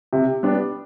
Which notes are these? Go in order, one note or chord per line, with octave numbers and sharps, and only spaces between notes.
C3
G3 B3 D4